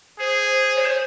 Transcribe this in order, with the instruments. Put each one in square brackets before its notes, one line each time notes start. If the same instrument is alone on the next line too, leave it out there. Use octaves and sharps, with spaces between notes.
[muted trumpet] G#4 [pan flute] C5
[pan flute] C#5
C5